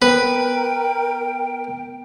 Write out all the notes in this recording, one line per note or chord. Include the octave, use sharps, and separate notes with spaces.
B3 A#4 B4 G5